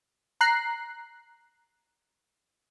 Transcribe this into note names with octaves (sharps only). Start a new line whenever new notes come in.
A#5 F#6 C7